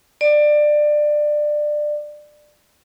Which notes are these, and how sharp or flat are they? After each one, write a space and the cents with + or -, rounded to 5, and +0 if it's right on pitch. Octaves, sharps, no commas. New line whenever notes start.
D5 +20